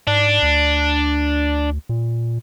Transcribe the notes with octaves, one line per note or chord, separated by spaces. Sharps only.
G#2 D4
D2
A#2